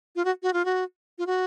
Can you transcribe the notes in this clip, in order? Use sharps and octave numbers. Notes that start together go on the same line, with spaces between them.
F4
F#4
F#4
F4
F#4
F4
F#4